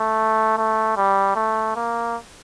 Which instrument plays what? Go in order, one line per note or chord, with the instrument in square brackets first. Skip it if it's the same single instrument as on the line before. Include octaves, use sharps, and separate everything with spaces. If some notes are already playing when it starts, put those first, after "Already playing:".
Already playing: [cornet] A3
A3
G3
A3
A#3